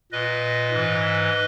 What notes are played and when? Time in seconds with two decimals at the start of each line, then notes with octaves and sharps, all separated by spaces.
0.12 A#2 B4 D#5
0.71 G#2 E3